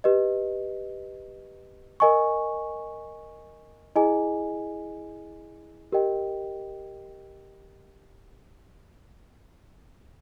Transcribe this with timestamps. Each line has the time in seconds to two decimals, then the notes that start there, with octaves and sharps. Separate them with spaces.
0.04 G4 B4 D#5
2.00 A#4 D#5 G#5 C#6
3.96 E4 G#4 D#5 G#5
5.92 G4 A#4 D#5 G5